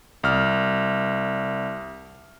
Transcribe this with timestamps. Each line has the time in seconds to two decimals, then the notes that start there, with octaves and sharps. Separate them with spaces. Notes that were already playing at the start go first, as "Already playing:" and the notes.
0.23 C2 F6